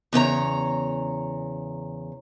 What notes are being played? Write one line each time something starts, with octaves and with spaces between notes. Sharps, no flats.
E2 C#3 C#5 A#5